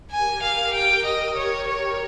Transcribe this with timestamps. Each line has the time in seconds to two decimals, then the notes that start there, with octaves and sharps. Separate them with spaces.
0.11 G4 A#4 G#5
0.42 F5
0.74 G4 A#4 G5
1.05 D#5
1.36 G4 A#4 C#5
1.68 C#5